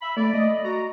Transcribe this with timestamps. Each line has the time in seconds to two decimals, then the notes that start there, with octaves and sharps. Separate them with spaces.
0.02 E5 B5
0.17 A3 D5
0.34 D#5
0.64 F#4 A#5